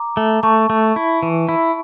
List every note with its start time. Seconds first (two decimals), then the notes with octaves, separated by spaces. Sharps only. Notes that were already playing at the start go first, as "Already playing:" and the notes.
Already playing: A#5 D6
0.17 A3
0.43 A3 A5 C#6
0.70 A3
0.96 E4
1.23 E3
1.49 E4